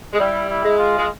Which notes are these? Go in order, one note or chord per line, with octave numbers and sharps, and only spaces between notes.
G#3
G3 E4
E4
G#3
F4
G#3